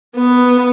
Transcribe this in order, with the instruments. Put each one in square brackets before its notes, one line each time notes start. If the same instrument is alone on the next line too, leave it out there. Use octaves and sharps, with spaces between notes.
[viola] B3